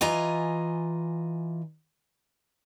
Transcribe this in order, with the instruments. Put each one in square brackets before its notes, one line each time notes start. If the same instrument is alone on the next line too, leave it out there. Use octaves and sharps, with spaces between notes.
[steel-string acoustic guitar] E3 F4 D#5 G#5 A#5